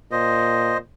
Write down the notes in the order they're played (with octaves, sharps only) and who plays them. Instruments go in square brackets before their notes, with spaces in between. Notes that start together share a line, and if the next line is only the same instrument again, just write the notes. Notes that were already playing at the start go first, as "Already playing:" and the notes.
[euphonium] A#2 [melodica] C5 D#5